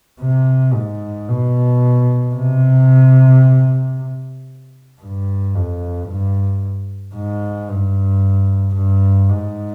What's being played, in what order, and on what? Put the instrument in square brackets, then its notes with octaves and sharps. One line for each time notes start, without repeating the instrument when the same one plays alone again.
[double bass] C3
G#2
B2
C3
G2
F2
G2
G#2
G2
G2
G#2